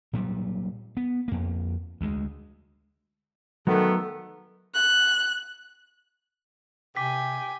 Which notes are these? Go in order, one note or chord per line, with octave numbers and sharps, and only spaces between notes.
A#2 F#3 G3
B3
F2 A#3
D2 G#3
D#3 F#3 A3 B3 A4
F#6
C3 G5 G#5 D6 B6